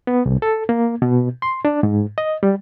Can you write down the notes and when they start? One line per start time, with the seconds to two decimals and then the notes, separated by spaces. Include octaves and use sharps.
0.07 B3
0.26 C2
0.42 A4
0.69 A#3
1.02 B2
1.42 C6
1.65 D4
1.83 G#2
2.18 D#5
2.43 G3